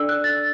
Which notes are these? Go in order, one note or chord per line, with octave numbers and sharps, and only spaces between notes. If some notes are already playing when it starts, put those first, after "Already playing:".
Already playing: D4 A4 D5 E6
F#6
A6